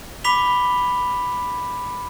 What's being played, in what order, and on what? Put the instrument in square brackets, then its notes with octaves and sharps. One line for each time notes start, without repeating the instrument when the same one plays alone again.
[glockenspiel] B5 D6 B6 F7 G7